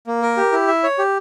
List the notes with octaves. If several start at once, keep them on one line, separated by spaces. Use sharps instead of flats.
A#3
A#4
G4
E4
E5
C#5
G4